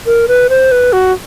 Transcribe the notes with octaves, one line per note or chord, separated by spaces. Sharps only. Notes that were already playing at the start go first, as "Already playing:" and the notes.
A#4
B4
C5
B4
F#4